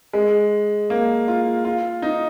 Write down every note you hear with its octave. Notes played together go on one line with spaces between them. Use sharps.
G#3
A#3
F4
F4
D#4